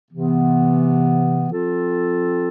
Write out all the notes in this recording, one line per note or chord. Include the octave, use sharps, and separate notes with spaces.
C3 E3 B3
F3 C4 F4 A4